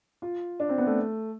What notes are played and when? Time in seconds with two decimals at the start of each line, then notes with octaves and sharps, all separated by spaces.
0.22 F4
0.60 D4
0.69 C4
0.78 B3
0.87 A3